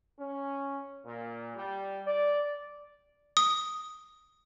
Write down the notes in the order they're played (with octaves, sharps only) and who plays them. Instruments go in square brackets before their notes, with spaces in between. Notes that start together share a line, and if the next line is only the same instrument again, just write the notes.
[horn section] C#4
A#2
G3
D5
[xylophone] D#6